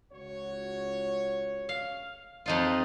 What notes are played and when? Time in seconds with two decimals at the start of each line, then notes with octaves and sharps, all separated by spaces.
0.12 C#2 F#4 C#5
1.69 F5
2.46 F2 D#4 F4